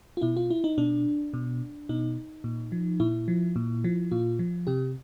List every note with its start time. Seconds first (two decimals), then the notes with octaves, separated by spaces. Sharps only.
0.17 F4
0.21 B2 E4
0.37 F4
0.50 E4
0.64 D#4
0.78 B2 D4
1.34 B2
1.89 B2 D#4
2.44 A#2
2.72 F3
3.00 A#2 E4
3.28 F3
3.56 A#2
3.84 F3
4.11 A#2 F4
4.39 F3
4.67 C3 G4